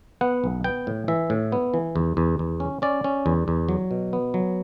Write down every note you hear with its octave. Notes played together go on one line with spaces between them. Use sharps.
B3 F#5
B1
B3 G5
A2
E3 E5
A2
B3
E3
E2
E2
E2
C#4
C#4 D5
C#4
E2
E2
F#3
B2
B3
F#3